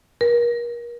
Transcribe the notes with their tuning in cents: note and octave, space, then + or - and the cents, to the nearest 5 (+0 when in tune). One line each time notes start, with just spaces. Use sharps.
A#4 +35